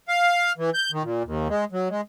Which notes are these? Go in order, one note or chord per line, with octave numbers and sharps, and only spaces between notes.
F5
E3
G6
D#3
A#2
D#2
G#3
F#3
G#3